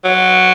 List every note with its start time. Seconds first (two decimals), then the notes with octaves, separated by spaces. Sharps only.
0.05 F#3